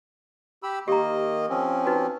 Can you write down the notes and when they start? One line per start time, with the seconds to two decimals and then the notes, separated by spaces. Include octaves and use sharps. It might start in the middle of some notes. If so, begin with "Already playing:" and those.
0.63 G4 B5 E6
0.88 D#3 A#3 G4 D#5 A#5
1.50 F3 C4 C#4
1.86 D#4 F#4 B4